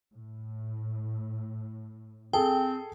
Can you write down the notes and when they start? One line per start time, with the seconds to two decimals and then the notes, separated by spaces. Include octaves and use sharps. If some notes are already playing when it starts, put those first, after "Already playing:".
0.12 A2
2.33 C4 G#4 A4 G5